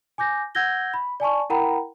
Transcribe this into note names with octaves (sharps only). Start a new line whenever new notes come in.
G#5 D6 G6 A#6
F#5 E6 G6 G#6 A#6 G7
B5
D5 G#5 A5 C#6
E4 A#4 F#5 G5 A#5 B5